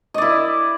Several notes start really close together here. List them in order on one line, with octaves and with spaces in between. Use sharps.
D#5 D5 E4